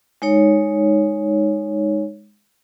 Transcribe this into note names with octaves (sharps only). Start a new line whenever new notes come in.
G#3 D#4 C#5